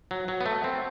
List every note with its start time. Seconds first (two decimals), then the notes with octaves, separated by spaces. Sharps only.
0.11 F#3
0.28 F#3
0.41 B3
0.46 A3
0.64 C4